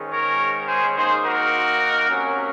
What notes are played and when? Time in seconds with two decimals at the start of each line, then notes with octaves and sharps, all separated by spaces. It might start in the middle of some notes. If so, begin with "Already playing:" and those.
Already playing: G#2 D#3 G#3 C#4
0.11 A#4 C#5
0.67 G#4 C5
0.96 D#3 A#3 D#4 G#4 C5
1.25 F#4 A#4
2.10 C3 F#3 A#3 C#4